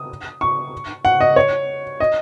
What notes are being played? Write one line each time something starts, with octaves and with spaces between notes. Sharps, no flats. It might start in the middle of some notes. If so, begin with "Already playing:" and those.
Already playing: D#6
C#6
F#5
D#5
C#5
D#5